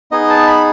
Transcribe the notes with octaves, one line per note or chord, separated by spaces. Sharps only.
B3 D#4 G#4 D#5
A5
B5